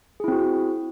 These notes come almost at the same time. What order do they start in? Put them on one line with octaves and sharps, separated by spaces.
G#4 E4 C4 F#4